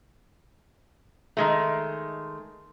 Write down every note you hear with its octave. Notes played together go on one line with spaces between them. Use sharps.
D#3 G#3 A3